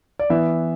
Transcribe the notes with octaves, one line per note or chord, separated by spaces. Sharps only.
D5
E3 B3 E4 E5